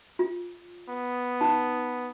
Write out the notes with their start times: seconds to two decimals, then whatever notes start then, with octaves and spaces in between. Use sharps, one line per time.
0.19 F4
0.89 B3
1.41 D#4 A5